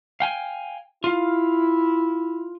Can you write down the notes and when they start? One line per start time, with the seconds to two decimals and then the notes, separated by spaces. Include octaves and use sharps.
0.20 F5 G5 G#5
1.04 E4 F4 F5